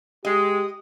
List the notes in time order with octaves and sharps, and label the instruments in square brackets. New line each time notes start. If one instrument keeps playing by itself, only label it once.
[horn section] G#3 [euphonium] G4 [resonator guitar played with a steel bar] D#5